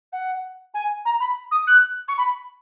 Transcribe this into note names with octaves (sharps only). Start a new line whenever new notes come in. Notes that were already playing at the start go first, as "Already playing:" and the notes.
F#5
G#5
A#5
B5
D#6
F#6
C#6
B5